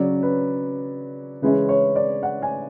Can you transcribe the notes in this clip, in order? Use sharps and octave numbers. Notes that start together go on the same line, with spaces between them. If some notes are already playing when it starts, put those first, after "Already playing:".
Already playing: C#3 F#3 C#4 D5
B4
C#3 E3 G#3 C#4 E4 B4
C#5
D5
F#5
G#5